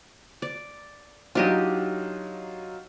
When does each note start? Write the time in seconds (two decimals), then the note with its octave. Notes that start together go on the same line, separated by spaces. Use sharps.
0.42 D5
1.35 F#3 D4 D#4 F4 G4 D#5